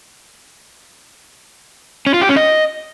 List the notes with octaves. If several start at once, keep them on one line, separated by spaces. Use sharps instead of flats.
C#4
F4
G4
C#4
D#5